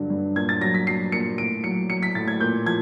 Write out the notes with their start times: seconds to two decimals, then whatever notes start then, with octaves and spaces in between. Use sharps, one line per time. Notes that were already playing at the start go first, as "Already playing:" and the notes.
Already playing: G2 D3 F#3
0.10 G2
0.36 A#2 G#6
0.49 A6
0.61 F#3 A#6
0.74 B6
0.86 F#3 C7
1.12 A#2 C#7
1.38 A2 D7
1.64 F#3 C#7
1.89 F#3 C#7
2.03 B6
2.15 A2 A6
2.28 G#6
2.40 A#2 G6
2.66 F3 G#6